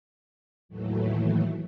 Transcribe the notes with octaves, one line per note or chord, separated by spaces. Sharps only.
D#2 A2 E3 F#3 A3